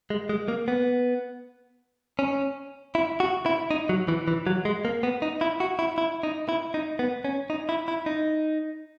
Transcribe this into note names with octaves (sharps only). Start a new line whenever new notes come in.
G#3
G#3
A#3
B3
C#4
E4
F#4
E4
D#4
F#3
E3
E3
F#3
G#3
A#3
B3
D#4
E4
F#4
E4
E4
D#4
E4
D#4
B3
C#4
D#4
E4
E4
D#4